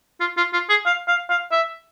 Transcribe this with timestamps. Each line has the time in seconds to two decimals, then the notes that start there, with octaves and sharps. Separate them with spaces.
0.20 F4
0.37 F4
0.53 F4
0.69 G#4
0.86 F5
1.08 F5
1.30 F5
1.52 E5